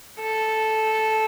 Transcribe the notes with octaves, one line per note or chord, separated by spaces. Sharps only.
A4